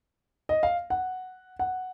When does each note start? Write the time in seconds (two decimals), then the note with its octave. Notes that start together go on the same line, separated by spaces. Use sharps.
0.49 D#5
0.63 F5
0.90 F#5
1.59 F#5